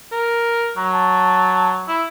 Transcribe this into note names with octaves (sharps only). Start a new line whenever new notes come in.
A#4
F#3 A#5
A5
E4